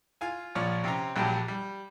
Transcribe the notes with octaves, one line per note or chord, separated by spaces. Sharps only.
F4 F5 G#5
A#1 F3 C#5 D5 F6
C3 C4 C#4 A#5
A#1 F#3 G3 G4 G5 A5
G3